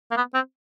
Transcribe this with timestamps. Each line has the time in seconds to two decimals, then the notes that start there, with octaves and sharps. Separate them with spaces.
0.11 A#3
0.17 B3
0.34 C4